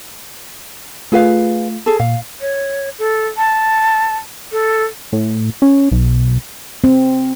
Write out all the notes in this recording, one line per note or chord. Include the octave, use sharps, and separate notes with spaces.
A3 F4 G#4 B4 F5
G#4 A4
A#2 F5
C#5
A4
A5
A4
A2
C#4
B1
C4